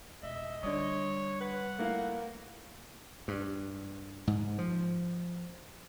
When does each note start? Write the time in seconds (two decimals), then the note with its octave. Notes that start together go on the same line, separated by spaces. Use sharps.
0.23 E1 D#5 E5
0.63 D3 G3 C#5 D5 D#6
1.41 B4 F#5
1.79 A3 A#3 E4 F5
3.28 G2
4.27 G#2
4.58 F3